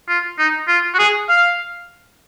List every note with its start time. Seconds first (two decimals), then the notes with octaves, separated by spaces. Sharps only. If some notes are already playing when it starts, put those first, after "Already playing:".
0.09 F4
0.39 D#4
0.68 F4
0.94 F#4
0.99 G#4
1.29 F5